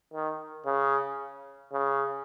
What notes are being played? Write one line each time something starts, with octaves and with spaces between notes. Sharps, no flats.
D#3
C#3
C#3